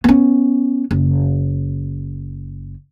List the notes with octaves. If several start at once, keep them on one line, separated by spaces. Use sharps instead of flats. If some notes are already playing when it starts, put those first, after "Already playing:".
B3 C#4
F#1